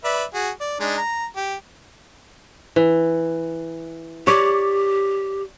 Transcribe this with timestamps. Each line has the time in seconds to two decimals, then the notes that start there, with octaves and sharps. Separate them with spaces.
0.04 B4 D5 E5
0.34 F#4 G#4
0.60 D5
0.80 G#3 D4 D#4
0.97 A#5
1.37 G4
2.76 E3
4.27 G4 C#5 D5